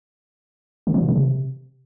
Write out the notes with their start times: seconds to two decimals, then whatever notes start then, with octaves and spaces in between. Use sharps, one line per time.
0.87 D3
0.94 F3
1.01 B2
1.08 D3
1.16 C3